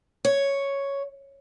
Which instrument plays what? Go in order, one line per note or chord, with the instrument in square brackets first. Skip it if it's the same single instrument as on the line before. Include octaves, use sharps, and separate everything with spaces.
[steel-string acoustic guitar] C#5